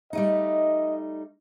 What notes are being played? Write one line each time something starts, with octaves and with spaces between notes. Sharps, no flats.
G3 A3 D#4 D#5